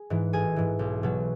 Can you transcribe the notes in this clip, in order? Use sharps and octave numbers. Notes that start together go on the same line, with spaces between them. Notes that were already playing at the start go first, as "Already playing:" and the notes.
Already playing: G#4
G#2 E3
A1 G#4 G#5
G#2 E3
B1
B2 F#3